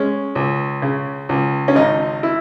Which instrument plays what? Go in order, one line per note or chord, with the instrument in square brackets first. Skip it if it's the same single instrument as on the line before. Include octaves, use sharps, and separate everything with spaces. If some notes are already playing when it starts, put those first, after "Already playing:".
Already playing: [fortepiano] G#3 C#4
C#2
C#3
C#2
C#4
G#1 D#4
E4